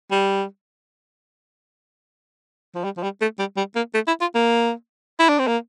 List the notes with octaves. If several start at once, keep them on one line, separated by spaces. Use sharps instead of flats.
G3
F3
G3
F3
G3
A3
G3
G3
A#3
A3
E4
F4
A#3
E4
D4
C4
A#3